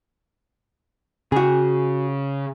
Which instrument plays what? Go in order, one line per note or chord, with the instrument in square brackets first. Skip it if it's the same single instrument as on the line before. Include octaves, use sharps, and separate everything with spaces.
[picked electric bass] C#3 [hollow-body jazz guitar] F#4 G#4